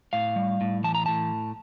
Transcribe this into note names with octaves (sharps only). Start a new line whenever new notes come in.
A2 F5
G3
A2
E3 A5
A#5
A2 A5